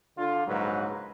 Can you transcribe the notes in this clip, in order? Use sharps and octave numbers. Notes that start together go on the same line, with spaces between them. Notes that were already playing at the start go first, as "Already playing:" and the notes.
D3 F4
A#1 G#2 C#3 F#3 B4